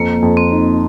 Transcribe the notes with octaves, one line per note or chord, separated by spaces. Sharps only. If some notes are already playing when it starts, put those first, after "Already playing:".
Already playing: F2 A#3
F2
C4
D#4